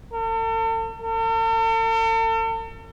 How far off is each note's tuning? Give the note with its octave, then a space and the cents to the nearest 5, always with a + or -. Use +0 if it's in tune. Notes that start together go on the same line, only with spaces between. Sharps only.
A4 +45
A4 +45